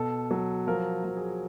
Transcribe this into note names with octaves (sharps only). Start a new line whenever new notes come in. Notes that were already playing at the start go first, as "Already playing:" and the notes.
Already playing: B2 A4
F#3
F3 A#4
F3
G#4